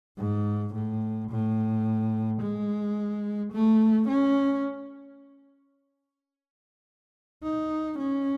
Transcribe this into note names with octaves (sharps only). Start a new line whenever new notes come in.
G#2
A2
A2
G#3
A3
C#4
D#4
C#4